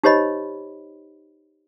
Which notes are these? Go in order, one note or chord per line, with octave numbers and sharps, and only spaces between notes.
D#4 G4 C5 C#5 D#5 B5